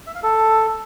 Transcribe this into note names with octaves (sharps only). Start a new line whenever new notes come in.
E5
F5
A4